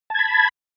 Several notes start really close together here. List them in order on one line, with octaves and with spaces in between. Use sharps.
A5 G#6 B5